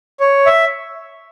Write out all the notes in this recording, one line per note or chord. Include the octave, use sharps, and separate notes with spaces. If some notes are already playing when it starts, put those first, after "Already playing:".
C#5
E5